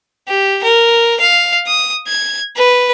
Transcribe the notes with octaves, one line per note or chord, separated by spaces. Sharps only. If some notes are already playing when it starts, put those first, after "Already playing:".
G4
A#4
F5
D#6
G#6
B4